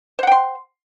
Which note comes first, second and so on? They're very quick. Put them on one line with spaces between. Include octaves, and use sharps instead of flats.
C5 F#5 G5 C6